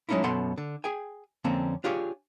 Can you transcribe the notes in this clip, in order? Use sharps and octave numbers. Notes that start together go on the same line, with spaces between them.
F#3 G#3 A3 C#4 D#4 E4
F#2 B2 A4 F#5 C6
D3
G#4 G5 G#5
F2 D3 A#3 C4 C#4
D4 F4 G4 G#4 C#5